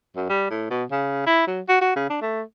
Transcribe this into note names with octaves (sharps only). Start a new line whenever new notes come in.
F#2
G3
A2
B2
C#3
E4
F#3
F#4
F#4
C#3
D4
A3